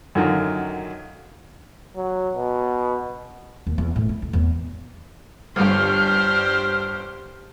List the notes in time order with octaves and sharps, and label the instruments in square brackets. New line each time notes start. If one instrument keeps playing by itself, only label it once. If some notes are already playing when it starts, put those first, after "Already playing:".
[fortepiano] F#2 D3 D#3 F#3 F4
[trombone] F#3
B2
[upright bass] D#2
E2
A2
E4
D2
E2
[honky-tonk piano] G1 G2 [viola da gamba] D4 G4 C5 [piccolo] F6